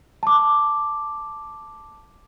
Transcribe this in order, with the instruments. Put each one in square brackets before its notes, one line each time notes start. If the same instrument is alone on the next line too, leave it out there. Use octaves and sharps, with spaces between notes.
[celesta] A5 D6